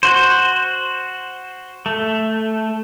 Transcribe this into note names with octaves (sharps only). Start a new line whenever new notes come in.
F#4 C5
A3